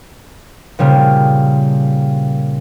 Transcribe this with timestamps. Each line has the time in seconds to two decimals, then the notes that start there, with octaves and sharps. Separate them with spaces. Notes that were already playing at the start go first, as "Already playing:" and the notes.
0.79 A#2 C#3 G3 A#3